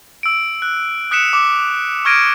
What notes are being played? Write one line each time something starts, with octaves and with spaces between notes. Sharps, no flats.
E6 D7
F#6
D#6 F#6 B6 C#7 E7
D6
C#6 F6 G#6 A#6 D7 D#7